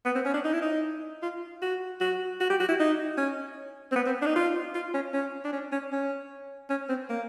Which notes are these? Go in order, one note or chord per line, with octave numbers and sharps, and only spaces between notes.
B3
C4
C#4
D4
D#4
E4
D#4
F4
F#4
F#4
F#4
G4
F#4
E4
D#4
C#4
C4
B3
C4
D4
D#4
F4
F4
C#4
C#4
D4
C#4
C#4
C#4
C#4
C4
A#3